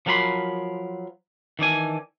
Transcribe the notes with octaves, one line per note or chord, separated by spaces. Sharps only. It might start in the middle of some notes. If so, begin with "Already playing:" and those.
F3 F#3 A#4 A5 B5 C6
D#3 E3 D4 G#5